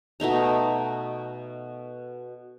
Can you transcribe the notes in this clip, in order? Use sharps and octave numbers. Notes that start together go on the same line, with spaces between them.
B2 A3 D#4 A#5